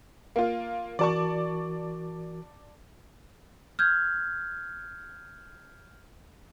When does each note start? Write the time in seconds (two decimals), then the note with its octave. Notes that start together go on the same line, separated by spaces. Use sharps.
0.36 A#3 F4 F5
0.99 E3 F#4 A#4 D5 A5 C#6
3.79 F6 G6 G#6